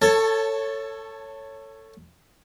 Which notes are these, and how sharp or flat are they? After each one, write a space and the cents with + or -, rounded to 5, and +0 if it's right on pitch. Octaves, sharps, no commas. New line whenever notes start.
A4 +20 C#5 +0 A5 -5